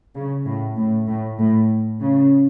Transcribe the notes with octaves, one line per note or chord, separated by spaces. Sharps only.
C#3
A2
A2
A2
A2
C#3